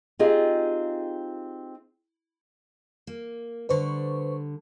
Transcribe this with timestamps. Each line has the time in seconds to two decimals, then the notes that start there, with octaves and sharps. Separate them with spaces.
0.19 C4 D#4 F4 G4 G#4 D#5
3.07 A#3
3.69 D3 G3 B4 C5 C#6